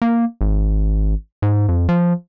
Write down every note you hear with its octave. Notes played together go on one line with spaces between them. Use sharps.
A#3
G#1
G#2
F2
F3